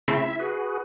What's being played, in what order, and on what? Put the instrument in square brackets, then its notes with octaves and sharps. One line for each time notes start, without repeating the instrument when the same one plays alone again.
[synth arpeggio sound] C#3 A3 C4 [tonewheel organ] E4 E5
[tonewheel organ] F#4 G#4 B4